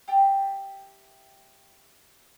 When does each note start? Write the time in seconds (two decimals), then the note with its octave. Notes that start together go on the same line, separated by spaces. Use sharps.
0.08 G4 E5 G5 A5